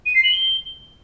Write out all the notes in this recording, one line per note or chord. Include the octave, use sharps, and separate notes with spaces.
D#7
C7
F#7
G7